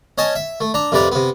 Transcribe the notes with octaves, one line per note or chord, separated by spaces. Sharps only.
C#4 D#5 G#5 A5
E5
A3
D4 A#5
F2 C3 B4 D5 A#5
C3 B3